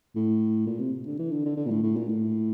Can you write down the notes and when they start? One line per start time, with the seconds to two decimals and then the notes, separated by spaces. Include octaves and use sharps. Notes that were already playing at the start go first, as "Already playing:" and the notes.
0.16 A2
0.67 A#2
0.79 C3
1.06 D3
1.19 E3
1.31 D3
1.45 D3
1.57 D3
1.66 A#2
1.71 A2
1.83 A2
1.96 A#2
2.09 A2